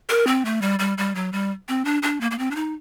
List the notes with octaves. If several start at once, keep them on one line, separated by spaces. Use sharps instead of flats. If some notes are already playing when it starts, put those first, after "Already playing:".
A#4
C4
A3
G3
G3
G3
F#3
G3
C4
D4
D4
A#3
A#3
C4
D4
D#4